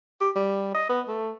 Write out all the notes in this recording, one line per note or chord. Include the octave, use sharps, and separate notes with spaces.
G4
G3
D#5
B3
A3